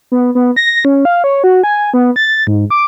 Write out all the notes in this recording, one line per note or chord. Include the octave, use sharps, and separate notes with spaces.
B3
B3
A#6
C#4
F5
C#5
F#4
G#5
B3
A6
G#2
D6